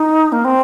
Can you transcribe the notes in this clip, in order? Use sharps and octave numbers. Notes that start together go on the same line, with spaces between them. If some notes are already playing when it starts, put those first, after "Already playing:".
Already playing: D#4
A#3
C4